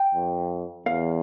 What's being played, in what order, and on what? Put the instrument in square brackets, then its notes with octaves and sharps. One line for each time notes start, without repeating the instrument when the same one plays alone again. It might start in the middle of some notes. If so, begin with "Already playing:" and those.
Already playing: [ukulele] G5
[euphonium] F2
[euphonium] E2 [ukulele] F5